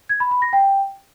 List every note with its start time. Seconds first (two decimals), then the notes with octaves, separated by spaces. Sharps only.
0.09 G#6
0.20 B5
0.31 B5
0.42 A#6
0.53 G5